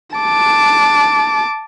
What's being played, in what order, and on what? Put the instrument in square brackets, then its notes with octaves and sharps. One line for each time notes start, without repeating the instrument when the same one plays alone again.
[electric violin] A5 D6